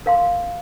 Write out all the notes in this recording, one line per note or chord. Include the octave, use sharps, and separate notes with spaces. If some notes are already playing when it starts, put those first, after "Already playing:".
A#4 F5 C6